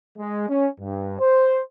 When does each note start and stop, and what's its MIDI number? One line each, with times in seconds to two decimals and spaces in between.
0.18 0.48 56
0.49 0.69 61
0.80 1.15 43
1.20 1.61 72